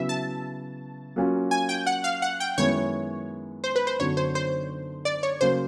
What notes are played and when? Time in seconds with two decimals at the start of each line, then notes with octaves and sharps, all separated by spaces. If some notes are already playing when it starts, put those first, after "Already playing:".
Already playing: C#3 F#3 B3 E4 E5
0.09 A5
1.16 F#3 A#3 C#4 F4
1.51 G#5
1.69 G5
1.86 F#5
2.04 F5
2.22 F#5
2.40 G5
2.58 F#2 D#3 G#3 B3 E4 C#5
3.64 C5
3.76 B4
3.87 C5
3.99 F#2 D3 F#3 B3 D#4 C#5
4.17 C5
4.35 C5
5.05 D5
5.23 C#5
5.41 C#3 F#3 A#3 C5